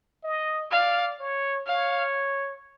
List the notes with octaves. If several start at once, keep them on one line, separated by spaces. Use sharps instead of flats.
D#5
D5 F5
C#5
C#5 F5